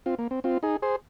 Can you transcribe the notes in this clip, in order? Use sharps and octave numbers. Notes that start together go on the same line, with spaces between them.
C4 F4
A#3
C4
C4 F4
D#4 G#4
G#4 C5